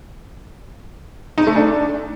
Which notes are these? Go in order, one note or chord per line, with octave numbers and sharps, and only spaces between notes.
D#4
A3
D4